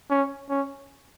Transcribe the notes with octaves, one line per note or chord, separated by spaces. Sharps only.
C#4
C#4